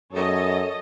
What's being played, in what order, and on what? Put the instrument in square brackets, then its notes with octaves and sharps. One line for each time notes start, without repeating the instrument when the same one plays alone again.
[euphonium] F#2 [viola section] A4 C#5 D#5